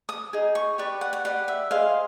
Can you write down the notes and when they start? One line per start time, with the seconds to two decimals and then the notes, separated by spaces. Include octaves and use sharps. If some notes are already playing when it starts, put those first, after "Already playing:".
0.09 D#6
0.33 D#4 G#4
0.55 C#6
0.78 G4 B4 D5 C#6
1.01 F#5
1.13 F#5
1.25 G4 B4 D5 F#5
1.48 E5
1.71 G#4 C5 D#5 F5